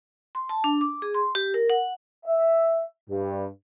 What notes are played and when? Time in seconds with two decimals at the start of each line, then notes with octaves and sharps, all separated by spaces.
0.35 C6
0.49 A5
0.64 D4
0.81 D6
1.02 G#4
1.14 C6
1.35 G4
1.54 A#4
1.70 F#5
2.25 E5
3.09 G2